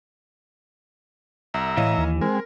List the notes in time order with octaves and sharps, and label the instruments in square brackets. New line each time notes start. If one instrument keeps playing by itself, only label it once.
[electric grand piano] C2 [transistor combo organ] E5 A#5
[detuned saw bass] A2 [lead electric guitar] E3 [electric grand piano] C#5 D#5 F5
[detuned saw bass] D#2
[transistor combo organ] G#3 [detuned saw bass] C4 [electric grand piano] A#4